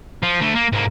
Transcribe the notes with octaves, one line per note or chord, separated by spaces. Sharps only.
F3
D2 A3
A#3
G#2 A#3